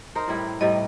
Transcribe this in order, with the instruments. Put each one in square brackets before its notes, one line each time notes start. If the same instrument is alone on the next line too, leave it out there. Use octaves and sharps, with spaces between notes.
[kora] D#4 A#4 C5
A2 G3 E4
[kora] A2 C3 G3 [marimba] D#5